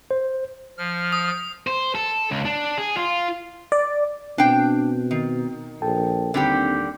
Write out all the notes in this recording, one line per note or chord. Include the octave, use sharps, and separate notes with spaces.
C5
F3 F6
D#6
C5
A4
C#2
D4
G#4
F4
D5
B2 C4 D4 G5
D#3
A#1 A4 G5 A5
D#2 D3 G3 C4 G4 G5